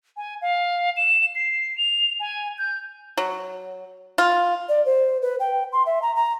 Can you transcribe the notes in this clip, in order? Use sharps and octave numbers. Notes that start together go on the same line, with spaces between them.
G#5
F5
E7
C7
F7
G#5
G6
F#3
F4
D5
C5
B4
G5
C6
E5
A#5
A#5